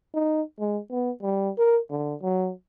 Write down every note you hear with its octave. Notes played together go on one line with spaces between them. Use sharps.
D#4
G#3
B3
G3
A#4
D3
F#3